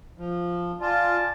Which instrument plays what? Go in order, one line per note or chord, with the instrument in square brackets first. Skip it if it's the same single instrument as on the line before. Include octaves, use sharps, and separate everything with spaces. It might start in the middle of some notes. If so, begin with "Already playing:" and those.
[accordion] F3
[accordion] F4 [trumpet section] D5 G#5 A5